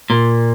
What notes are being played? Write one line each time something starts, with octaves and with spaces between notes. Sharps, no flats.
A#2